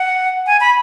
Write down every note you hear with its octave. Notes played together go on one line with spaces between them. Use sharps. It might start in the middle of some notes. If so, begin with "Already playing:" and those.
Already playing: F#5
G#5
B5